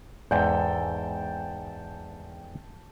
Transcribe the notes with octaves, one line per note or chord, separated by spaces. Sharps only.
E2 G#2 A4 G5